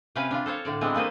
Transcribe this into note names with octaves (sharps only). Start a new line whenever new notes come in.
C3 C#4 B4 F5 G5 G#5
D4 F4
A4 C5 C#5 F5
A2 D3 D5
E3 G#3 B3 C4 D4
A3 A#3 B4 C5 D#5